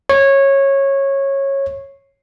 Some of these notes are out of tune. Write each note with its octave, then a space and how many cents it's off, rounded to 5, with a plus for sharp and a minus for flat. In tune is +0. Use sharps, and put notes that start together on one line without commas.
C#5 -15